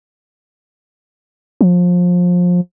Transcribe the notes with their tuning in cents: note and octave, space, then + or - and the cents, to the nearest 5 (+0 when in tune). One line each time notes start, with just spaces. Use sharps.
F3 +25